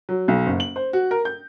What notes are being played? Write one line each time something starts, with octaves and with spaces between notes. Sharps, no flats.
F#3
B1
F#1
F#7
C5
F#4
A#4
G6